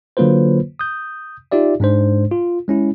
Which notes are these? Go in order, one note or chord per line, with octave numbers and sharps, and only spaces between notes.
D3 F#3 A#3 F4 B4 C5
D#6 G6
D#4 F4 G4 D5 E5
G#2 G#3 D4 C5
F4
G#3 C#4 E4